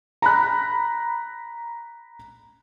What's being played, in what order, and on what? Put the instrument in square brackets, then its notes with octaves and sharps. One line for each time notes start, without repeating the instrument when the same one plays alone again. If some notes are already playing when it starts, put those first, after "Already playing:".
[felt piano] A#5 B5 F#6